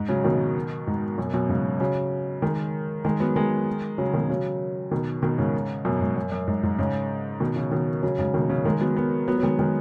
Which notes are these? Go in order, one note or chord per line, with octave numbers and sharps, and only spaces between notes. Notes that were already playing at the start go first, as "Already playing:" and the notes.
Already playing: G#2
C#3 F#3
B2 D#3
G#2
F#2 B2
F#2 B2
G#2 C#3
C#3 F#3
D#3 G#3
D#3 G#3
F#3 B3
D#3 G#3
C#3 F#3
B2 D#3
C#3 F#3
B2 D#3
B2 D#3
G#2 C#3
F#2 B2
G#2
F#2
F#2
G#2
G#2
G#2 C#3
B2 D#3
C#3 F#3
B2 D#3
C#3 F#3
G#2 C#3
B2 D#3
C#3 F#3
D#3 G#3
F#3 B3
F#3 B3
F#3 B3
F#3
D#3 G#3
D#3 G#3